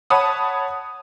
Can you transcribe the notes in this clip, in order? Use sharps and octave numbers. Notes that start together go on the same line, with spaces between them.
C#5 F#5 A5 B5 D#6